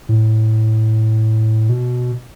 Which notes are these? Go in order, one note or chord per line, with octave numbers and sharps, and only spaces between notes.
A2
B2